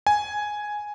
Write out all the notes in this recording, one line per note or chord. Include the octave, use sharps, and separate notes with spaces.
G#5